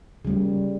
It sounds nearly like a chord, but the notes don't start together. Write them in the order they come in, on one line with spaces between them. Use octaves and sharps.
C#3 G3 A#3